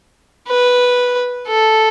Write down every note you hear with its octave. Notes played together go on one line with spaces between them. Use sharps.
B4
A4